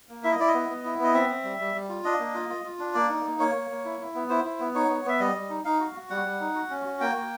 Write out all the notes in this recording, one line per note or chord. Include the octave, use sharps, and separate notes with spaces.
A#3
E4 E5
D#5
E4 D5
D#5
B3
B3
E4
B3
D#5
C4 E5
C4
G3
G3
G3
F4
D4 D#5
A#3
F4
F4
F4
D4
A#3 D5
D#4
A#3
A#3 C#5
A#3
A#3
E4
E4
B3
E4 C5
E4
B3
D#4 C#5
B3
B3 E5
G3 D#5
G3
D#4
D#4 F5
F#4
F#4
G3 F#5
G3
D#4
F#4
C#4
F#4
A#3 G5
A#3